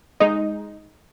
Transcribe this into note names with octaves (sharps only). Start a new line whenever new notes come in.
G#3 D#4